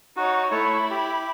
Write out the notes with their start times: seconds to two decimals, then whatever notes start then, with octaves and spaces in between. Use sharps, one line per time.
0.17 D#4 F#4 C#5
0.51 A3 E4 C#5 B5
0.90 G4